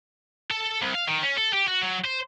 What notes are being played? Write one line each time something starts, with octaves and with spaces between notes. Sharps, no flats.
A4
C2
F5
D#3
C#4
A4
G4
F#4
F#3
C5